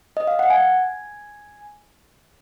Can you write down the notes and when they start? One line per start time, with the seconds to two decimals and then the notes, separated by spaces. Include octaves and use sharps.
0.17 D#5
0.27 F5
0.39 F#5
0.50 G#5